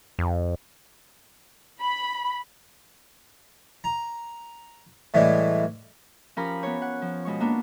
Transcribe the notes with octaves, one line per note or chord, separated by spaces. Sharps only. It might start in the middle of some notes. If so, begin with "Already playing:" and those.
F2
B5
A#5
A2 E3 G3 G#3
F3 C#4 G4 A#4 F5 B5
B3 C#5
F#5
F3
B2 G#3 C#6
A#3 B3 D4